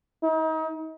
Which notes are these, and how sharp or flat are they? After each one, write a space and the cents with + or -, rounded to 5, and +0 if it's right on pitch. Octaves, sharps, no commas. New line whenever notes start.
D#4 +35